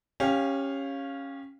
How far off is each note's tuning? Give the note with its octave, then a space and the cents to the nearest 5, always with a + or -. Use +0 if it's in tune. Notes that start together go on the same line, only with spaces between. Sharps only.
C#4 -10 G4 +15 F5 +0